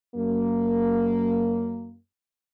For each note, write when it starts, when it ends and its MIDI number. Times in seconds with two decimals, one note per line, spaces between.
0.15 1.97 42
0.15 1.97 58